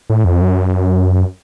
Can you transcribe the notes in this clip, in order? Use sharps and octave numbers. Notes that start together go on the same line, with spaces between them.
A2
F2
F#2